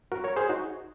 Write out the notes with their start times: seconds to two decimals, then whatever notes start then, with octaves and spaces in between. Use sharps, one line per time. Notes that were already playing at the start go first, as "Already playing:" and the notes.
0.12 F#4 A#4
0.24 A#4 C#5
0.36 G#4 C5
0.49 D#4 F#4